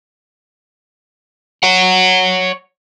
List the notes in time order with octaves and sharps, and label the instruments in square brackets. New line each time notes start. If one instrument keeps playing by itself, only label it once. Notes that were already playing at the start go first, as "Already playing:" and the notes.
[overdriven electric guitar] C#5 F#5